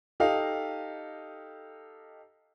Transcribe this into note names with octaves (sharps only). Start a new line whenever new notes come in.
D#4 G4 A4 D#5 F5